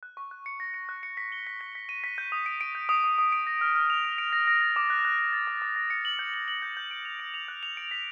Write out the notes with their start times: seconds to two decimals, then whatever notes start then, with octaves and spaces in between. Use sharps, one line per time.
0.03 F#6
0.17 C#6
0.31 F#6
0.46 C#7
0.60 A#6
0.74 C#7
0.89 F#6
1.03 C#7
1.17 B6
1.32 G7
1.47 B6
1.61 B6
1.75 B6
1.89 D#7
2.04 B6
2.18 G6
2.32 D#6
2.46 D7
2.61 D7
2.75 G6
2.89 D#6
3.04 D#6
3.18 D#6
3.32 D7
3.47 A#6
3.61 F6
3.75 F6
3.90 F7
4.05 D7
4.18 D7
4.33 A#6
4.47 A#6
4.61 A6
4.76 D6
4.90 F#6
5.05 F#6
5.19 F#6
5.33 A6
5.47 D6
5.62 D6
5.76 A#6
5.90 C#7
6.05 F#7
6.19 G6
6.34 F#7
6.48 F#7
6.62 G6
6.77 G6
6.91 D7
7.05 F7
7.19 D7
7.34 F7
7.48 F#6
7.63 F7
7.77 D7
7.91 B6